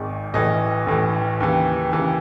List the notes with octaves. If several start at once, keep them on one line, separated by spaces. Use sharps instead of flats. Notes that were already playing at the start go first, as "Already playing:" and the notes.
Already playing: G#1 G#2 D#3
A1 A2 E3 D#5
A1 A2 E3
D#2 C#3 E3
D#2 C#3 E3